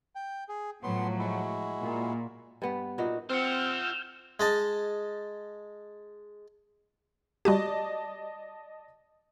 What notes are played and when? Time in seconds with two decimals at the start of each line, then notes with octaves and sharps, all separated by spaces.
0.15 G5
0.49 G#4
0.84 A2 F3 F#3 B3 C6
1.19 G#3 E4 F#4
1.83 A#2
2.62 G2 B3
2.98 A#2 D#4 E4 F#4
3.29 C4 F4 F#5 E6 F6 G6
4.40 G#3 D#5 A5
7.45 G3 F#4 G4 D5 D#5 A5